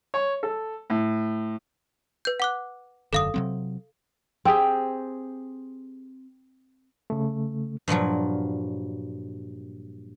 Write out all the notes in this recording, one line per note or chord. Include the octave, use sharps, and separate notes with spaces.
C#5
A4
A2
B4 G6
F#5 D6 F#6
E1 F#2 D3 A4 F5 D#6
C3 F#3 C4
C4 G4 G#4
C#3 A3
G2 A#2 F3 F#3